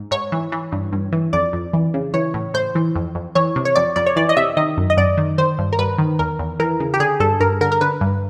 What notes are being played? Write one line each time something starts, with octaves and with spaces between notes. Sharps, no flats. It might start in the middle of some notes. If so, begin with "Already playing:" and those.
Already playing: G#2
G#2 C#5
E3
E3
G2
G2
E3
F2 D5
F2
E3
C#3
E3 C#5
A2
A2 C5
E3
F2
F2
E3 C#5
C3
C#5
F2 D5
F2 D5
C#5
E3 D5
D#5
C3 E5
D#3 D#5
F#2
D#5
F#2 D5
D#3
D#3 C5
G2
A#4
G2 B4
D#3
E2 A#4
E2
E3 A#4
C#3
G4
D3 G#4
G2 A4
G2 A#4
D3 A#4
A#4
D3 B4
G2